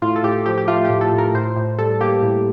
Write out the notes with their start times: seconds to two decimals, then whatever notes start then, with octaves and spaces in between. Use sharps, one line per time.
0.02 A2 F4
0.16 A4
0.23 A2 G4
0.46 F3 G4
0.58 G4
0.68 A3 F4
0.84 A2 G4
1.01 A4
1.12 A2
1.18 A#4
1.34 A2 C5
1.56 A2
1.79 G3 A4
2.01 A#3 G4
2.22 A2